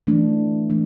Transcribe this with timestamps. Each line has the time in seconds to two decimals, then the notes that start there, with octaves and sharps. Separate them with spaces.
0.07 E3 A3 D4
0.70 E3 A3 D4